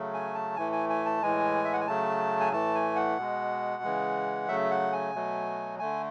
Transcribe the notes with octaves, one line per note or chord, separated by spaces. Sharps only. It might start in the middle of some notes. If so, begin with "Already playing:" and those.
Already playing: C#3 F#3 A3
G#5
A5
A2 E3 A3 G#5
G#5
G#5
A5
A2 E3 G#3 G#5
E5
F#5
G#5
C#3 F#3 A3 A5
G#5
A2 E3 A3 A5
G#5
F#5
B2 G#3
C#3 E3 G#3
C#3 F#3 A3 E5
F#5
G#5
B2 F#3 A3
D3 A3 G#5